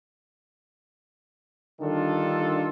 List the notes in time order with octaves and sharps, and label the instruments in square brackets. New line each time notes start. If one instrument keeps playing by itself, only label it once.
[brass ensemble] D3 D#3 G3 D4 F4 A4